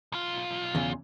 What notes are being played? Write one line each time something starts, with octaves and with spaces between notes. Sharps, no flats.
B1 F4
E2 C#3